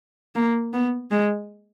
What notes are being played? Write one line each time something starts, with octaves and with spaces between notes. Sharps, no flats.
A#3
B3
G#3